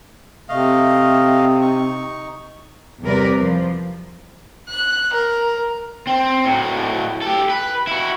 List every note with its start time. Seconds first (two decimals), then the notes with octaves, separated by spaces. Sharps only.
0.49 C3 A3 D#5 F5
1.62 D#4 C#6
3.02 E2 C3 G3 A#4 B4 D5
3.38 F3
4.69 F#6
5.13 A#4
6.07 C4
6.45 A2 F#3
7.22 G4 A4
7.49 B4
7.87 E4 F#4